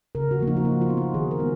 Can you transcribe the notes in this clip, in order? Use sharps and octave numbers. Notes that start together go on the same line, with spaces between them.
C#3 A#4
F#4
F3 A#3
D#4
F#4
F3 F4
F4
B3 D#4
F#4
D#3 G#4
A#4
G#3 B3 D#4